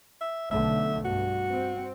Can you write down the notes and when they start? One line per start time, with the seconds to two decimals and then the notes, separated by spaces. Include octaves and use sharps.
0.21 E5
0.51 B1 D3 A3 E5
1.05 G2 F#4
1.51 C4